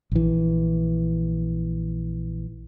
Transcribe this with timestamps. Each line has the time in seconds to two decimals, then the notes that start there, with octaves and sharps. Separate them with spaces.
0.12 A#1 E3